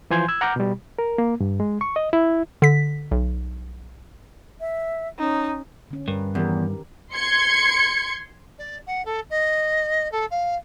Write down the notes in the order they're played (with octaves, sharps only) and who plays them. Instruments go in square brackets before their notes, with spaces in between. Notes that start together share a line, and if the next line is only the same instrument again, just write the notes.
[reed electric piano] E3 F3 G#5 C6 G6 G#6
E6 G#6
F#5 A#5 D6 F6 G6
B2 G3
A#4
A#3
G2
G#3
C#6
D#5
E4
[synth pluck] D3 B6
B1
[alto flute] E5
[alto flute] C#4 [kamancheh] D#4
[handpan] D3 C#4
[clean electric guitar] G2 [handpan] A#4 B4
[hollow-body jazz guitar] E2 [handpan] D#3 G4 A#4
[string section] C6 G#6 C#7
[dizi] D5
F#5
A4
D#5
A4
F5